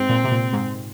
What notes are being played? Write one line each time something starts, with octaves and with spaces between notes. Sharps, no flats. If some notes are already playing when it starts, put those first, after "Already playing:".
Already playing: G#2 C4
A#2
C3
A#2
G#2